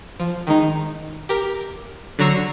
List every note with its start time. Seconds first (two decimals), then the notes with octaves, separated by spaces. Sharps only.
0.20 F3
0.47 D#3 G#3 D#4
1.29 G4 A#4
2.19 D3 F#3 A#5 C#6 E6 C7